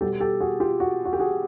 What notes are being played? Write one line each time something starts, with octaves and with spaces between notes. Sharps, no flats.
B2 G3 B3 G4 A4
G4 A4
F#4 G#4
F4 G4
F#4
F#4
G4
F#4 G#4